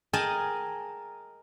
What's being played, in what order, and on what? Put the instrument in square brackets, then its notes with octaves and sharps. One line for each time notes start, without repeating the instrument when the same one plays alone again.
[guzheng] G#4 A#4 D#5 G5 A5